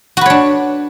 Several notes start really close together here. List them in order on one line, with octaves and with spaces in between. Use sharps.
F#4 B4 C#5 D4